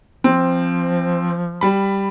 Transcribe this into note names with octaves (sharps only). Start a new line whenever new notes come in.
F3 C4
G3 B5